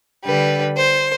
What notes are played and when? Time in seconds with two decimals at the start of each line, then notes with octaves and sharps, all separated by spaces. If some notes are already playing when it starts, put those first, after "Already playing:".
0.25 D3 G3 B4
0.77 C5